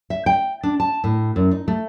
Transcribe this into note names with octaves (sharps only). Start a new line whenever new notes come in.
E5
G5
D4
A5
A2
F#2
D#4
A3